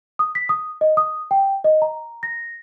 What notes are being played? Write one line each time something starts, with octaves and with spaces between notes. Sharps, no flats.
D#6
B6
D#6
D#5
D#6
G5
D#5
A#5
A#6